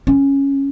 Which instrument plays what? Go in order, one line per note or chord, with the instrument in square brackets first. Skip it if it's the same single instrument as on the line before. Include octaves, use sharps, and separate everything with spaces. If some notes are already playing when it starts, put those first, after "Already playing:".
[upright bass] C#4